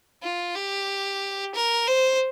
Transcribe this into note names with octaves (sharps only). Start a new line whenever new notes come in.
F4
G4
A#4
C5